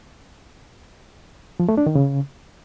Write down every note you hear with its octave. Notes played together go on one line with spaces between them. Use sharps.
F3
A3
D4
D#3
C#3